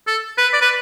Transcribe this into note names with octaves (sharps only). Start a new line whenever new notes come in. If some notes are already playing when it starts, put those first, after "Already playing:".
A4
B4
D5
B4